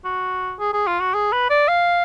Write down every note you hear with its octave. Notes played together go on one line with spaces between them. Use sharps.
F#4
G#4
G#4
F4
F#4
G#4
B4
D5
F5